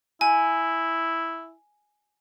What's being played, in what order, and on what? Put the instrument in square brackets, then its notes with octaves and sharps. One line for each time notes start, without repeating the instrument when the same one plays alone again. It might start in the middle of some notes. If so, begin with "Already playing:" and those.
[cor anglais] E4 [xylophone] G#5